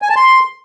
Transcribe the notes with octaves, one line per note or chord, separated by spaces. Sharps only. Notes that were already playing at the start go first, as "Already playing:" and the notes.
G#5
A5
C6